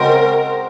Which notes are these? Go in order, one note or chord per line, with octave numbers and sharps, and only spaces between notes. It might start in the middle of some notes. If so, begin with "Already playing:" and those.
Already playing: C#3 G#3 C4 F#4 A#4 C5